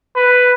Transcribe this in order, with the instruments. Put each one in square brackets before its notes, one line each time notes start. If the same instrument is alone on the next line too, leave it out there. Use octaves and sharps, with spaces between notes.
[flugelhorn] B4